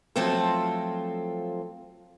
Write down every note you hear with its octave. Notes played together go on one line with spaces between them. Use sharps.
F3 F#3 A3 C4 F4 A4